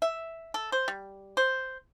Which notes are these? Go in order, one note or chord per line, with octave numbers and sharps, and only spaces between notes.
E5
A4
C5
G3
C5